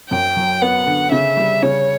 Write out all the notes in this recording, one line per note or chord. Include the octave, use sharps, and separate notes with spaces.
F#2 G5
F#3
B3 F#5
D3
C#3 E5
G3
C#3 C#5